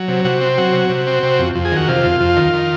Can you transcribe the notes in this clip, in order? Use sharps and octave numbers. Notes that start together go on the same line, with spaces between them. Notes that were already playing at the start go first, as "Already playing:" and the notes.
Already playing: F#3
C3
C3 F#4
C4
F#3 F#4
C3
C3
C4
C3
F2
F2
G#4
D#3 F#4
C3 F4
F2
F2
D#3
D#3